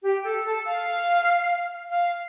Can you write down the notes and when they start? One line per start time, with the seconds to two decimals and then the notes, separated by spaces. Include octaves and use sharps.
0.03 G4
0.24 A4
0.45 A4
0.65 F5
1.90 F5